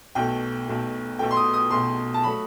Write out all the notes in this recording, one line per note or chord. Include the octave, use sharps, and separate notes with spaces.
B1 B2 A3 G5
B1 B2 A3
B1 B2 A3 G5
C6
D#6
D#6
B1 B2 A3 C6
A5
F#3 A3 B5